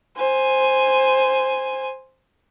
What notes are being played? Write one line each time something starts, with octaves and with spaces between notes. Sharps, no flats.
C5 G#5